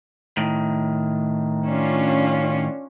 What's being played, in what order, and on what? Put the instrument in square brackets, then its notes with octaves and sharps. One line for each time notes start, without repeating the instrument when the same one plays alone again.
[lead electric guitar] A2 D#3
[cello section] C#4 D4 F4